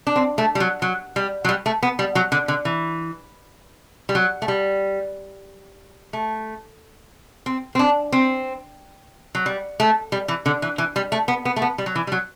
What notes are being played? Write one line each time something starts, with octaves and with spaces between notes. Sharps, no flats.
D4
C4
A3
G3
F#3
F#3
G3
F#3
G3
A3
B3
G3
F#3
D3
D3
E3
G3
F#3
A3
G3
A3
C4
C4
D4
C4
F#3
G3
A3
G3
E3
D3
E3
E3
G3
A3
B3
B3
A3
B3
G3
F#3
E3
G3
F#3